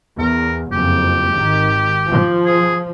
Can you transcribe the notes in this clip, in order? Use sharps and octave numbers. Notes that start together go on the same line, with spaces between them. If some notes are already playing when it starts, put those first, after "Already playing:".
E2 A#4
F#1 F2 G4
G#1 D#3
F3
G#4